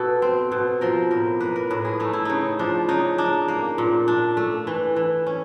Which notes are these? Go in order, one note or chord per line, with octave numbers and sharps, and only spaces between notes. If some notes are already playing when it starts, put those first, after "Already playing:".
Already playing: B2 A4
C4
B2
F3 A#4
A2 A#4
A#3 B4
A#4
A2 B4
G#4
A3 D#4
E4
C#3 D#4
F3 D4
C#3 D#4
D4 D#4
A#3
A#2
D4
A3
E3
E3
C#4